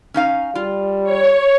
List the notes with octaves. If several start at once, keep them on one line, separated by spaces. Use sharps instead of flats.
C#4 D#4 F5
G3 F4
C#5